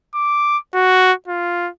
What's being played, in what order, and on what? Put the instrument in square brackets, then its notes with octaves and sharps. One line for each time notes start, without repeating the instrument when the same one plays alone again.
[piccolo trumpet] D6
F#4
F4